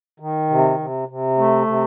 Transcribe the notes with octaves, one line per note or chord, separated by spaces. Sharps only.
D#3
C3
C3
C3
A3
C3